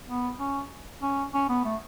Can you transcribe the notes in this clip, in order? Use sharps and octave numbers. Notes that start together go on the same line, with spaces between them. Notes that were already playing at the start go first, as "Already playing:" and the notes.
B3
C#4
C#4
C#4
B3
A3